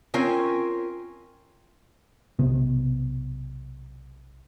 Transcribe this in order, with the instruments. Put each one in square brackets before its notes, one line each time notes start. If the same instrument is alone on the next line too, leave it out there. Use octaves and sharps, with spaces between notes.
[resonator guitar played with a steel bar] C4 C#4 F4 A#4 G5 G#5
[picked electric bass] B1 C3 B3